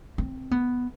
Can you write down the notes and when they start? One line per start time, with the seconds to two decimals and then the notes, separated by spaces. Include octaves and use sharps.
0.18 C4
0.51 B3